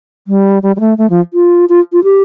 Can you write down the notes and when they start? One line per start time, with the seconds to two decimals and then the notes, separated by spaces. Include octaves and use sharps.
0.27 G3
0.63 G3
0.76 G3
0.80 A3
0.98 A3
1.10 F3
1.33 F4
1.69 F4
1.93 F4
2.04 G4